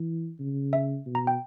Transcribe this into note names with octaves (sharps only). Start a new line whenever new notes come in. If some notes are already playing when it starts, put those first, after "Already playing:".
Already playing: E3
C#3
E5
B2
A#5
G5